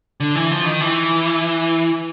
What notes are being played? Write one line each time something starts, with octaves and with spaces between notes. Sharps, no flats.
D3
E3
F3
D#3
E3